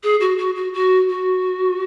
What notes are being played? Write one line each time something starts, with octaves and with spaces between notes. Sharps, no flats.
G#4
F#4
F#4
F#4
F#4
F#4